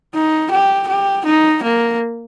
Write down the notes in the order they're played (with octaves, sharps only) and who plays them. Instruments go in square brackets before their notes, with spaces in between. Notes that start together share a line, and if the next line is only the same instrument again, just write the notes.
[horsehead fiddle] D#4
G4
G4
D#4
A#3